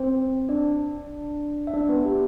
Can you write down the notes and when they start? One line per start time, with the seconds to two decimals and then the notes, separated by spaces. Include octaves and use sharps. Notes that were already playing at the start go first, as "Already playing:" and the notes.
Already playing: C4 C5
0.49 D4 D5
1.67 E5
1.74 D4 D5
1.89 B3 B4
2.05 G4